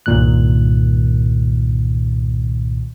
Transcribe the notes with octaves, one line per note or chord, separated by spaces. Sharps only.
C2 G2 A#2 D#3 F#6